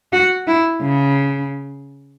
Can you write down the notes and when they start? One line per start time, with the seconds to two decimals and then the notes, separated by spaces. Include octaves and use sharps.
0.13 F#4
0.47 E4
0.81 C#3